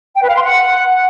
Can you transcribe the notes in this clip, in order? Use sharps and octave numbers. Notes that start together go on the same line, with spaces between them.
G5
B4
F5
C6
F#5